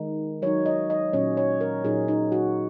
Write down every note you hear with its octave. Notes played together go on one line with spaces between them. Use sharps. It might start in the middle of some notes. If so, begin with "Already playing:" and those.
Already playing: D#3 G#3 D#4
F#3 D#4 C#5
D#5
D#5
A#2 F#3 C#4 C#5
C#5
A#4
A#2 F#3 D#4 G#4
D#4
F#4